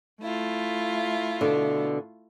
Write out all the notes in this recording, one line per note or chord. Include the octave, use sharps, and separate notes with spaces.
A3 E4 F4
B2 D3